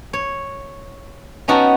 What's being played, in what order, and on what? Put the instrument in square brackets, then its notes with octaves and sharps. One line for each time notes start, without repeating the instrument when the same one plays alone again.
[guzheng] C#5
B3 C#4 D#4 F#4 G5 A5